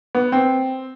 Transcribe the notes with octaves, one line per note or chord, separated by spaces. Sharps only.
B3
C4